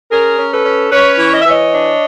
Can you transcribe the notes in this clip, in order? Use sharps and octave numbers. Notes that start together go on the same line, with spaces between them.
C#4 G#4 A#4
C#4
A4 B4
C#4
C#4 B4 C#5
E3
D#5
E5
E3 C#5 D#5
D4